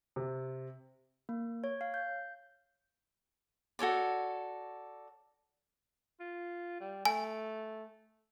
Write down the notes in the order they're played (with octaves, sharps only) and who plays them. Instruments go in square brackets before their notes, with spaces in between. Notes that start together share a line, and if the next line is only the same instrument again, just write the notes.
[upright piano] C3
[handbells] A#3
C#5
F5
G6
[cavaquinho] F#4 A4 C#5 D5
[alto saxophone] F4
G3
[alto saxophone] A3 [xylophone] G#5